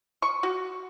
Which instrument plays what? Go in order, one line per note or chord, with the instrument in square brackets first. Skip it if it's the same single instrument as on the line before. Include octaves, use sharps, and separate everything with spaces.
[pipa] C#6
F#4